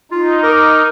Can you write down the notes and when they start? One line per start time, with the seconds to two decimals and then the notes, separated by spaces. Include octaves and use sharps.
0.12 D#4 F4
0.43 A#4 D6